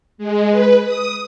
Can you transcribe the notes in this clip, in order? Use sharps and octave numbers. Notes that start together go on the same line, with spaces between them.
G#3
B4
D#6